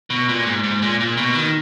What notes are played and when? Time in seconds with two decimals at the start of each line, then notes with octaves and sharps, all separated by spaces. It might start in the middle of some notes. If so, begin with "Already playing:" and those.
0.10 B2
0.29 A#2
0.46 G#2
0.64 G#2
0.82 A#2
1.00 A#2
1.17 B2
1.35 D#3